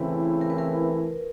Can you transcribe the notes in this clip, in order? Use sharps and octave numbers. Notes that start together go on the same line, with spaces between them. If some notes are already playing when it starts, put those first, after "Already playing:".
Already playing: C#3 E3 A3 C4 E4 B4
A#4
B4
A#4